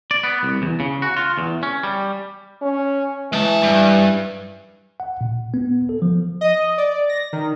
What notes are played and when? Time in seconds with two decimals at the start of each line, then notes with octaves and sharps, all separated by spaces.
0.11 D5
0.23 B3
0.43 C2
0.62 E2
0.80 C#3
1.02 F#4
1.17 F4
1.38 E2
1.63 C#4
1.83 G3
2.62 C#4
3.33 E3 G#3 A5
3.63 G2
5.00 F#5
5.21 A#2
5.54 B3
5.89 A4
6.02 F3
6.41 D#5
6.78 D5
7.09 A#6
7.33 D#3